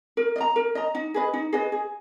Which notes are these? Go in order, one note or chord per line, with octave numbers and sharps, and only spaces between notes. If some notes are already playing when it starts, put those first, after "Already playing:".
A#4
D#5
A#5
A#4
D#5 A#5
D#4
G#4 B4 D#5
D#4
G#4 B4 D#5
G#4